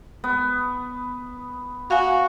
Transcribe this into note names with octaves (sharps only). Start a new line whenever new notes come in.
B3
F#4 F5 G#5